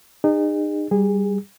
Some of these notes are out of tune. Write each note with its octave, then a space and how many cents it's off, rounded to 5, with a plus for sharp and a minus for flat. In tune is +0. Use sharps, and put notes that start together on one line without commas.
D#4 -35 G#4 -40
G3 +0 G#4 -20